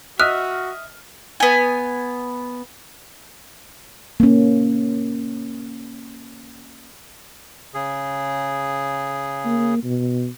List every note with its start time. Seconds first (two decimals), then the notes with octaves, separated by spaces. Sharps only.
0.20 F#4 D#5 E5 D#6 F6 F#6
1.40 B3 G#5
4.20 A#3 C#4
7.74 C#3 G#4
9.45 A#3
9.84 B2